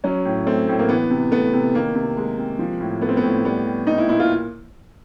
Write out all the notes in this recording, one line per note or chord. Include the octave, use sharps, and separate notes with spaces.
F#3 C#4
A2
A3 C4
A2
A#3
E3 B3
C3
A3 B3
C3
D#3 A#3
C3
G#3
C3
F3
A2
A3 B3
C4
B3
A2
G3 B3
G3
A#2 D#4
E4
A#2 E4
F4